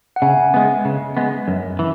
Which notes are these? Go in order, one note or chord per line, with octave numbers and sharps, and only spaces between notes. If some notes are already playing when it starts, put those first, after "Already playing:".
F#5
C#3 E5 G#5
G#3 B3
C#3
G#3 B3
F#2
E3